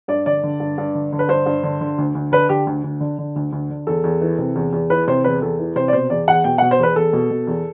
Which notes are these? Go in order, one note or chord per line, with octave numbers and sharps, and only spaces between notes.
G2 D5
D3 D5
D3
G2
G2
D3
D3
B4
G2 C5
G2
D3
D3
D2
D2
D3 B4
D3 G4
D2
D2
D3
D3
D2
D2
D3
E2 A4
E2
E3
C3
E2
E2
E3 B4
C3 C5
E2 B4
E2 A4
E3
C3 C5
D5
B2 C5
E2 D5
E2 F#5
B2 G5
B2 F#5
C5
E2 B4
E2 A4
B2
B2
E2